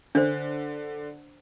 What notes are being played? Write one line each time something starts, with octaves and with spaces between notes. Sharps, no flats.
D3 D4 C5